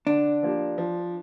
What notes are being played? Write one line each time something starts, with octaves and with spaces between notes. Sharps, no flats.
D3 D4
F3 A#3 G4
F3